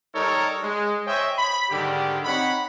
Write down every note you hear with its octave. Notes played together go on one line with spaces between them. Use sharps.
G3 D#4 A4 A#4 C#5
G#3
C5 C#5 D#5 E5 G5 G#5
B5
G#2 D3 D#3 G3 G4
C4 D#4 C#5 F#5 B5